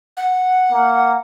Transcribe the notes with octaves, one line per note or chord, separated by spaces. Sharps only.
F#5
A#3